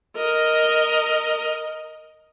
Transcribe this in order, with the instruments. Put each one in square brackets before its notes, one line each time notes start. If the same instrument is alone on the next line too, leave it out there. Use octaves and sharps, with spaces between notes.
[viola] A#4 D#5